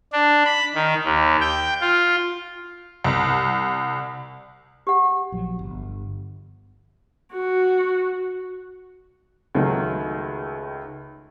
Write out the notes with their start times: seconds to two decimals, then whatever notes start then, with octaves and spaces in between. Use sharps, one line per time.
0.13 D4
0.45 B5
0.75 D#3
1.04 D#2
1.41 G5
1.81 F4
3.04 C2
4.87 G4 F#5
5.32 A#1 F3 F#3
5.59 G1
7.33 F#4
9.55 C#2 D#3 F#3 A3